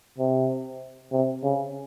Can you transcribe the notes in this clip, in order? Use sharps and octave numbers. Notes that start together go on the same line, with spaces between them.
C3
C3
C#3